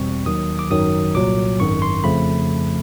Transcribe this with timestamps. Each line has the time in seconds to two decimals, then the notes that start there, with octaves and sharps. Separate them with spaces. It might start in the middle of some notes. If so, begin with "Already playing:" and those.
Already playing: E2 B2 G3 C4 C#6
0.26 D#2 D#3 F#3 D#6
0.59 D6
0.71 G#1 F#2 D#3 F#3 D#6
1.15 C2 A#2 F#3 D6
1.59 G#1 F#2 D#3 C#6
1.82 C6
2.04 F2 C#3 F3 A3 B5